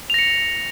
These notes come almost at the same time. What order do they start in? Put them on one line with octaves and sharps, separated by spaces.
F7 A#6 C#7